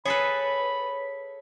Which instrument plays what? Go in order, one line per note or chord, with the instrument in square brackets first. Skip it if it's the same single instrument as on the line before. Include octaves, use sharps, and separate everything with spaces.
[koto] G#4 A4 B4 [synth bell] C#5 [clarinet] B5